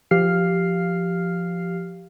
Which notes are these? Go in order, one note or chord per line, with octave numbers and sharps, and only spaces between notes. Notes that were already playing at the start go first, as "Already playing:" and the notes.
F3 G4 F5 F6 C7